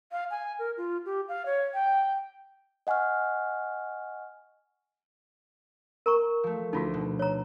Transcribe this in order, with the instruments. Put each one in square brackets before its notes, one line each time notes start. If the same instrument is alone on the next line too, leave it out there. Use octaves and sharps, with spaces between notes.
[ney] F5
G#5
A#4
F4
G4
F5
C#5
G5
[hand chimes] D#5 F#5 G#5 C#6 F6
[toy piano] A#4 A#5 C#6
[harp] F3 A3
[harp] D2 [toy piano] D#4 F4 F#4
[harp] B2
[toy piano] C#5 A#5